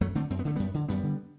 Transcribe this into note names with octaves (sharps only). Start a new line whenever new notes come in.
F#2 F#3 A3
D3 A3 C4
F#2 C4
B3
D3 A3
F#2 G3 B3
D3
F#2 G3 B3
D3